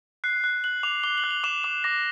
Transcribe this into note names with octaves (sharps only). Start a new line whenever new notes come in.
F#6 C7
F#6
F#6 F#7
D6 F7
D6 G7
F#7
F#6
F7
D6 E7
D6 E7
D6 A#6